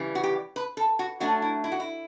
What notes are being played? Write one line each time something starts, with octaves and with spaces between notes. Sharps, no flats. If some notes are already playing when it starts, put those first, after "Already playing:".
Already playing: C#3 E3 G3
F#4
G4
B4
A4
F#4
F#3 A3 D4 F#4
E4
E4
F#4
E4